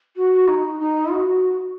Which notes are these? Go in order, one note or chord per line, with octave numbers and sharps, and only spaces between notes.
F#4
D#4
D#4
F#4